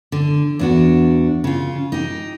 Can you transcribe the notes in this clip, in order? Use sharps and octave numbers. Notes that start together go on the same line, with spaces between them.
D3
E2 D4 F#4
C#3 F4
D#4 G4